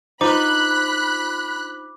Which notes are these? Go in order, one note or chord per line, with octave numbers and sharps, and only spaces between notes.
D4 D#4 F4 C5 B5 D6 F#6